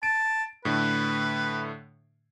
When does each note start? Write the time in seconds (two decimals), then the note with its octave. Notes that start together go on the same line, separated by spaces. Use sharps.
0.03 A5 D7
0.65 A2 D3 A3 B4